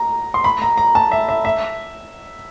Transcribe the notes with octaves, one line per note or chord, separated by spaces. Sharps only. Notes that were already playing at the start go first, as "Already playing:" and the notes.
Already playing: A#5
C6
B5
A#5
A#5
A5
E5
E5
E5